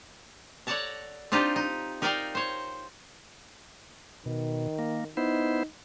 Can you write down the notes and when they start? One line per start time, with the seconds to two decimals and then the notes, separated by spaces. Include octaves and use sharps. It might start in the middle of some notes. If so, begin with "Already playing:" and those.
0.67 A4 C#5 D5 F#5 A5 A#5
1.32 C4 D4 D#4 F4 G4
1.56 D#4
2.02 D#4 A#4 D5 F5 G5
2.35 C5 C#5
4.26 B2 D#3
4.79 A#3
5.17 B3 D#4 E4 C5